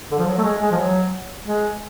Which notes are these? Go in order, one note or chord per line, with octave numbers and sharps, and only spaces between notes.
D3
F3
F#3
A3
G#3
G#3
F3
F#3
G#3